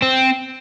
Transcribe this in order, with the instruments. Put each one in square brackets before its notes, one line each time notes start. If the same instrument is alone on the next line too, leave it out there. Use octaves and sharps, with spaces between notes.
[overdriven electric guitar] C4